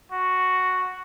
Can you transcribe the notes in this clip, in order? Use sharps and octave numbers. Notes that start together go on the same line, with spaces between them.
F#4